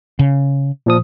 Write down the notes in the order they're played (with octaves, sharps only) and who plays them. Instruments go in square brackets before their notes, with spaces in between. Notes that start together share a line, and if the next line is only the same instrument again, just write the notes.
[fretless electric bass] C#3
[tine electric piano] A#2 F3 D#6